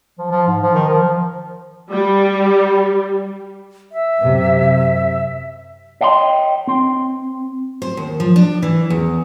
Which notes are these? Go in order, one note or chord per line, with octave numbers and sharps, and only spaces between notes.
F3
F3
G#2
F3
D#3
F3
F3
G3
E5
F#2 C3
C#5 D#5 G5 A5 C6
C4
C5
D#2
F3
D4
E3
E2